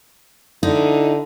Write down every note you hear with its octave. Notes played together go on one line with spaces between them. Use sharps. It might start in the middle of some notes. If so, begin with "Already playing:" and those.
D3 D#4 E4